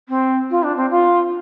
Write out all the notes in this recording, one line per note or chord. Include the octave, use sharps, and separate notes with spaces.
C4
F4
D4
C4
F4